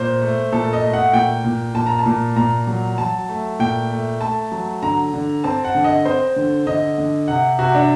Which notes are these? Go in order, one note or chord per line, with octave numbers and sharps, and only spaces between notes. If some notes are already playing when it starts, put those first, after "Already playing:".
Already playing: A#2 C5
A3
A#2 A4
D#5
A3
F#5
A#2 G5
A#2
A#2 A5
A#5
A5
A#2
A#2 A#5
F#3
F#3 A5
A3
A#2 G5
A3
A3 A5
F#3
D3 A#5
D3
C4 A5
F#5
D3
D#5
C4 C5
D3
D3 D#5
D3
C3 F#5
C3 F#4
D4